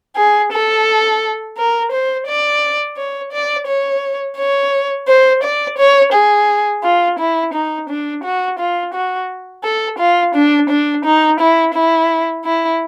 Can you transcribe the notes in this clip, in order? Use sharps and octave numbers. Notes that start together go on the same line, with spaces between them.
G#4
A4
A#4
C5
D5
C#5
D5
C#5
C#5
C5
D5
C#5
G#4
F4
E4
D#4
D4
F#4
F4
F#4
A4
F4
D4
D4
D#4
E4
E4
E4